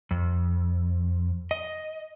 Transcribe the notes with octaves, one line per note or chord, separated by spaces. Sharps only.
F2
D#5